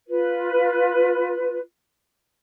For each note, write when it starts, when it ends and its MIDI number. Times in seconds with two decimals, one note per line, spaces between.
0.09 1.58 65
0.09 1.58 71